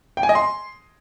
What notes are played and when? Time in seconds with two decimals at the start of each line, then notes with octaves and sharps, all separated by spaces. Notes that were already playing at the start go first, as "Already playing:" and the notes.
0.17 G5
0.23 G#5
0.29 D#5
0.35 C6